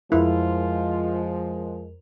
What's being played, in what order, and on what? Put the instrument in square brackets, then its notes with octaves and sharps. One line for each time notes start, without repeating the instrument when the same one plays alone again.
[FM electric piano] F2 A#4 [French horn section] F3 G#3 [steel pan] E4 [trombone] F4